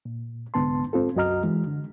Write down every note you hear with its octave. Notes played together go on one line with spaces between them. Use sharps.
A#2
C2 G#2 D3 B3 A5 C6
G#2 C4 F4 A4
C2 F#2 F#4 D#5 A#5 F6
E3 G#3
D3